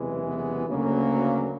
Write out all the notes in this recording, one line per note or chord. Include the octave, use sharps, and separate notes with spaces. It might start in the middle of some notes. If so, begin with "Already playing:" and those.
Already playing: F#1 E2 C3 E3 G#3
B3
D2 C#3 F#3 A#3